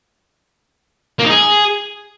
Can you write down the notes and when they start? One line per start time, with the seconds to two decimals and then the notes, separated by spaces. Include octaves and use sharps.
1.19 A#3
1.24 D#4
1.30 G#4